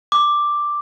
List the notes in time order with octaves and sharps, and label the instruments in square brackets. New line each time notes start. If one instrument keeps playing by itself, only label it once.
[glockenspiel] D6